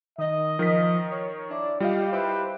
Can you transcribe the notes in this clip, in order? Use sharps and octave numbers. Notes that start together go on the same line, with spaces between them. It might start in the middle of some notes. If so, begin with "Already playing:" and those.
D#3 D#5
D#3 F3 A#4 B6
C#5
D4 E4 D5
G3 F4 G4 D#5 F5
E4 G4 B4 C5